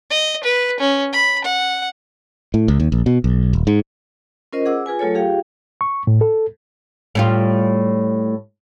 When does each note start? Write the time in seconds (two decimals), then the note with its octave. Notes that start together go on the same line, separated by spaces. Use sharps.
0.10 D#5
0.44 B4
0.80 C#4
1.13 B5
1.44 F#5
2.54 A2
2.68 C#2
2.80 D#2
2.92 A#1
3.06 B2
3.24 B1
3.53 D#1
3.67 G#2
4.53 C#4 F4 A#4 C5 D#5
4.66 G#4 F#5 D6 E6
4.86 F4 G#4 B4 G#5
4.99 F#3 A3 F4 A4 C#5
5.14 F4 G4 G#4 F5 G5
5.81 C#6
6.07 A2
6.21 A4
7.15 A2 G3 F4